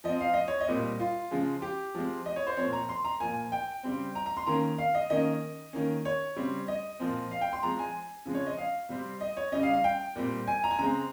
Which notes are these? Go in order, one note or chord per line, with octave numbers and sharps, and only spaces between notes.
F3 C4 D#5
F5
D#5
C#5
D#5
A#2 G3 C4
F4
C#3 F3 G#3
G4
F3 G#3 C4
D#5
C#5
C5
A#2 F3 C4 C#5
A#5
C6
A#5
A#2 F3 A#3 G#5
G5
C#3 G3 C4
A#5
A#5
C6
D#3 A#3 C#4 A#5
F5
D#5
D#3 A#3 C#4 D#5
D#3 A#3 C#4
C#5
C#3 G3 C4
D#5
A#2 F3 C4
F5
G5
C6
F3 G#3 C4 A#5
G#5
C#3 F3 G#3 C4
C#5
D#5
F5
C3 G3 C4
D#5
C#5
C#3 G3 C#4 D#5
F5
F5
G5
A#2 G3 C4
G#5
A#5
G#5
C#3 G#3 C4 A#5